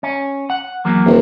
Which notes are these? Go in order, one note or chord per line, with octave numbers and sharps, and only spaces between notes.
C#4
F#5
E2 F#3 A#3
D#1